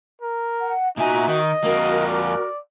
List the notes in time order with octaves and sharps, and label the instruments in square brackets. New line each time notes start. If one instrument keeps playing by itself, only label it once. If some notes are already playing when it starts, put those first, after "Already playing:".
[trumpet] A#4
[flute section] F#5
[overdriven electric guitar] A#2 G#5 [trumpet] D#4 [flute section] F#4 E5
[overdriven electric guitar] D#3 [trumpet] D#5
[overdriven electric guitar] F2 A#3 [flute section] F#4 A#4
[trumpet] D5